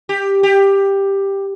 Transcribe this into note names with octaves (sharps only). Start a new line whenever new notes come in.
G4
G4